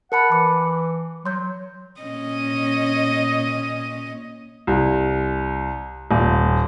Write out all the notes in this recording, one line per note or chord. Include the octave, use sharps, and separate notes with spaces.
A#4 F#5 A5 B5
E3 D6
F#3 C6 G6
A#2 C#4 D#5
C2
D#1